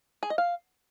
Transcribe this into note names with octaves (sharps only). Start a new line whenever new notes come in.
G#4
D#5
F5